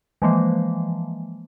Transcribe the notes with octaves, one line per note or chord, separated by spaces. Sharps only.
E3 F3 G#3 A#3